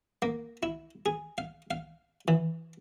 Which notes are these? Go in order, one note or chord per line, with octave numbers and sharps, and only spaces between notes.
A#3
E4
G#4
F5
F5
E3